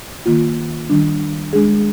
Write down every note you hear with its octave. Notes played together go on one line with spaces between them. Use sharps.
D#3 A#3 F4
D#3 G3 D4
G#3 D4 G#4